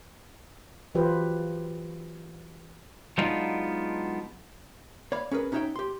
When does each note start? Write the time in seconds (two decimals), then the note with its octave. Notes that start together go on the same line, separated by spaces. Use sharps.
0.95 E3 F#3 F4 G4 B4 C5
3.18 F#3 G#3 B3 D4 D#4 F4
5.12 C#5 D5 F5 B5
5.31 C#4 G#4 A#4 B4
5.52 C#4 D#4 F#4 C#5 E5 G5
5.76 G4 C6